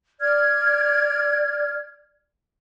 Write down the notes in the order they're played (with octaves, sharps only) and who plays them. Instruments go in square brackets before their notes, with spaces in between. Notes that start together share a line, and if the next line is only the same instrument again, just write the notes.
[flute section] D5 F6 G#6